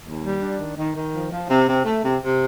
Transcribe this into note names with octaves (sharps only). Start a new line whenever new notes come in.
D#2
G3
D4
D#3
D#3
D#3
F3
F3
C3
C3
A3
C3
C3